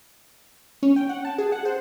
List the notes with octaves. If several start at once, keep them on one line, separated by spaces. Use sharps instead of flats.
C#4
G5
F#5
A5
G#4
F#5
C5